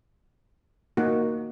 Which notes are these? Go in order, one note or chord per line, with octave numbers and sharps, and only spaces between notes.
A#3 D#4 F#4 F#5